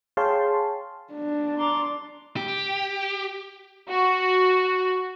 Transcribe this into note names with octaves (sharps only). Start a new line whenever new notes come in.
G#4 C#5 F5 G5 A5 C6
D4
A#5 C6 D6
G4
F#4